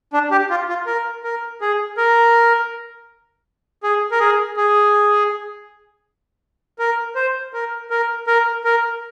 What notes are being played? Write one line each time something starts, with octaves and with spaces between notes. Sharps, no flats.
D4
G4
F4
F4
A#4
A#4
G#4
A#4
G#4
A#4
G#4
G#4
A#4
C5
A#4
A#4
A#4
A#4